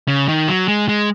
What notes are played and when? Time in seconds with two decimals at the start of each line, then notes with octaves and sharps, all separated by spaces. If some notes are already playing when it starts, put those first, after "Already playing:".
0.08 C#3
0.28 D#3
0.48 F#3
0.68 G#3
0.89 G#3